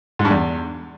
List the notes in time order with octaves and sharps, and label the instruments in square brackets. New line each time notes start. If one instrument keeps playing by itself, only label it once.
[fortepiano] G#2
G2
E2